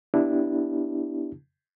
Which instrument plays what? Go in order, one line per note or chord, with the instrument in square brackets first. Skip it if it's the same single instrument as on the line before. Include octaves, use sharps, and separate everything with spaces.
[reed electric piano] B3 D4 E4 G4